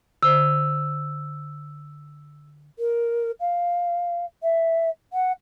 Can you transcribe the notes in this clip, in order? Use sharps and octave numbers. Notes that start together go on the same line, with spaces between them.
D3 C5 E6
A#4
F5
E5
F#5